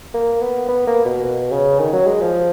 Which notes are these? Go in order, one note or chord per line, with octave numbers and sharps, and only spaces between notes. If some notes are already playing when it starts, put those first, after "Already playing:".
A#3
B3
B3
A#3
B2
B2
C#3
D#3
F#3
G#3
F3